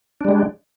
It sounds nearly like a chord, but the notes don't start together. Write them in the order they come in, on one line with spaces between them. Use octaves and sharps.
D4 G3 G#3